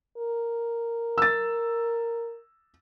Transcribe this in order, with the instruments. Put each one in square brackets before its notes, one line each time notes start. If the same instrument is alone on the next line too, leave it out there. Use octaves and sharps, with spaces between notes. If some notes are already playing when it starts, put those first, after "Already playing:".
[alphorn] A#4
[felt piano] E6 A6